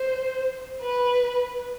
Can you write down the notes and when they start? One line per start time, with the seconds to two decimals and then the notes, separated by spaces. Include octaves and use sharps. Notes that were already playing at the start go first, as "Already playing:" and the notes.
Already playing: C5
0.82 B4